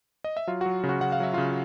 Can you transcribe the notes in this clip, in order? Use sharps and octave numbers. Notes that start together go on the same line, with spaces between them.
D#5
E5
F#3 F4 F5
F#4 F#5
F#3
C#3
F#4 F#5
C#3 F#5
F5
F#3 E5
C#3 F4 F5